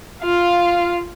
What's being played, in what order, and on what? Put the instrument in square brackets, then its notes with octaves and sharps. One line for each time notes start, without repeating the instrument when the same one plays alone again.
[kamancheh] F4 F5